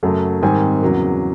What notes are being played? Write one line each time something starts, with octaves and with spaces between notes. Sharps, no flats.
F#2 C#3 F#3 A3
G#2 D#3 G3 C4 G#5
E2 C#3 F#3 A#3